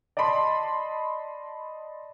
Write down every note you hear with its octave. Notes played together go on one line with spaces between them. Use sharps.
D5 D#5 A5 B5 C6